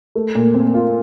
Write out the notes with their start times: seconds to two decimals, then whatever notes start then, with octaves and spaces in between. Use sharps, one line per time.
0.15 A3
0.35 A#2
0.54 C4
0.74 F4